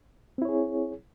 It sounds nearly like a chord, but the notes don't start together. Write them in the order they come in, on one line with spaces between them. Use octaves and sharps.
C4 E4 C#5 G#4